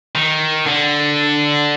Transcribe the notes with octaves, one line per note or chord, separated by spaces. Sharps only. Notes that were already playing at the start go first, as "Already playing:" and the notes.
D#3
D3